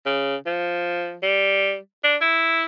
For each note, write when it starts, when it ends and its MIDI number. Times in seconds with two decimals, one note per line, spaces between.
0.06 0.36 49
0.46 1.17 53
1.23 1.76 55
2.04 2.16 62
2.21 2.65 64